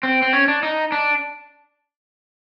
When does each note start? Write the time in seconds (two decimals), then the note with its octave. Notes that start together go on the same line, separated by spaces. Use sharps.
0.03 C4
0.22 C4
0.33 C#4
0.48 D4
0.63 D#4
0.92 D4